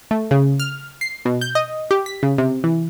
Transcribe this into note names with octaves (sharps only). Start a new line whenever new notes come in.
A3
C#3
F6
C7
B2
G6
D#5
G4
B6
C#3
C3
E3